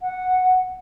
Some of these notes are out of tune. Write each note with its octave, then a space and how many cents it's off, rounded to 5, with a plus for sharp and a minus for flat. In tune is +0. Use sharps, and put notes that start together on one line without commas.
F#5 -5